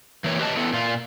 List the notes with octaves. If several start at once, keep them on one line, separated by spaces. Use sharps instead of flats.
E3 A#3 C#5
G4 B4 D#5 F5 A5
B3 E4 A4
A#2 F4